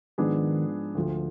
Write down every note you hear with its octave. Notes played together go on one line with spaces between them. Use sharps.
G#2 D#3 F3 B3 D4 G#4
D2 D3 F3